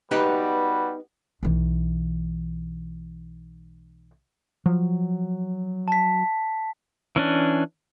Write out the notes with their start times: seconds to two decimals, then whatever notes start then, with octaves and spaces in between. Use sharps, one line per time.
0.11 G3 B3 D#4 F#4 G4 B4
1.43 B1 E3
4.66 F3 F#3
5.88 A5 B6
7.16 E3 C#4 D4